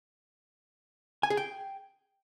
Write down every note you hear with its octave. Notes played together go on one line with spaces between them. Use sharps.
G#5
G#4
G5